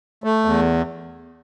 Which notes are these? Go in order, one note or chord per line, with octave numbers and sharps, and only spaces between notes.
A3
E2